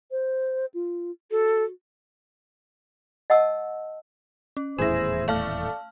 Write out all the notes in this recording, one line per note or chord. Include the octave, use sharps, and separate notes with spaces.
C5
F4
F#4 A4
D#5 F#5 A5 E6
C#4
D#1 E2 A2 E4 G#4 C5 A#6 E7
A3 D5 F5 A5 F6